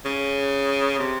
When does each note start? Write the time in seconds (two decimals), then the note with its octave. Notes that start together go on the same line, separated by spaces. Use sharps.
0.05 C#3
0.99 C3